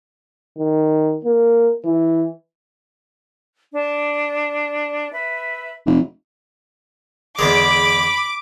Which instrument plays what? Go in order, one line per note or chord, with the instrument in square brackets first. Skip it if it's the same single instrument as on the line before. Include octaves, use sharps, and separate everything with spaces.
[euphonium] D#3
A#3
E3
[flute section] D4
B4 E5
[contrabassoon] F1
[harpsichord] E2 D3 G#3 [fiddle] B5 [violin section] D6